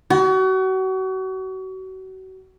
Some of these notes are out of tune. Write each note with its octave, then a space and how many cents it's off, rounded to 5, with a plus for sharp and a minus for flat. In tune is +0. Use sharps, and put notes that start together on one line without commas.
F#4 +35